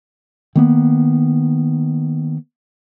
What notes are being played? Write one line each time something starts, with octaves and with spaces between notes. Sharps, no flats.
D#3 A#3 B3